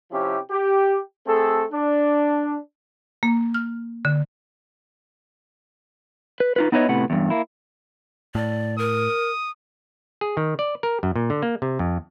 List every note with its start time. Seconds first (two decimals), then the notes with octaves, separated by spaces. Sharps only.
0.11 C3 F3 C4 C#4 E4 G4
0.51 G4
1.27 A3 C4 G#4 A4
1.71 D4
3.23 A#3
3.54 F6
4.05 D3
6.40 B4
6.56 D#4 F4 B4
6.72 B3 D#4 E4 B4 C#5 D#5
6.88 A2 C3 B3 F#5
7.10 E2 G2
7.30 A#3 E4
8.35 A2 D5
8.78 A#4 D#6
10.21 G#4
10.37 D#3
10.59 D5
10.83 A#4
11.03 F#2
11.16 A#2
11.30 D3
11.42 A#3
11.62 C3
11.79 F2